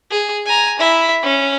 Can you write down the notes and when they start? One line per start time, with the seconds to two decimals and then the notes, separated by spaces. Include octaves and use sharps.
0.11 G#4
0.46 G#5 A#5
0.79 E4 E5
1.23 C#4